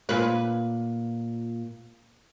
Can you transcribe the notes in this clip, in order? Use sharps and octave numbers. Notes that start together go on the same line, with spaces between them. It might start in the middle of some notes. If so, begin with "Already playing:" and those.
A#2 B4